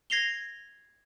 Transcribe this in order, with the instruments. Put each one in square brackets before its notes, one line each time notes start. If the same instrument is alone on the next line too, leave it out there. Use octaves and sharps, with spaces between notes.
[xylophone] G#6 A#6 C7 F7 G7